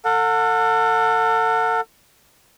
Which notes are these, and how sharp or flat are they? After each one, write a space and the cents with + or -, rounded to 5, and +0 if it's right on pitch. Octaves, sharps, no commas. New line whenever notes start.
A4 +35 F#5 -30